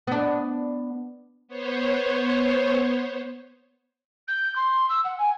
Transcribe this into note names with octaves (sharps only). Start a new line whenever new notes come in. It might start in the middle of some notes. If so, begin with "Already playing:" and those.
B3 D4
B3 C5 C#5
G6
C6
E6
F#5
G#5